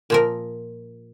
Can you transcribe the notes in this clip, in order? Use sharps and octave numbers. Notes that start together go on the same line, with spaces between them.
A#2 F3 A#4